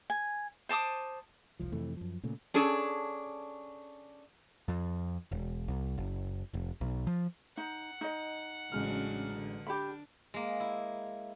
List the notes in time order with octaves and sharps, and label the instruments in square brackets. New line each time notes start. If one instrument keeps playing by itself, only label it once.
[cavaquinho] G#5
C5 A5 D6 D#6
[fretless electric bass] F1 C2 F3
F2 C3 E3 A3
F#2 F3
A#2 C#3 A3
[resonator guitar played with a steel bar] C#4 D4 G#4 A4
[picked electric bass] F2
E1
C2
F#1
F1
B1
F3
[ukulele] D#4 [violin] F#5
[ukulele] D#4 D#5
[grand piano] A1 G#3 F6 [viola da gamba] C#3 F#3 D4
[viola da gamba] D3
[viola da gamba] D4 [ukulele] G4 B5
[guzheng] G#3 A#3
E4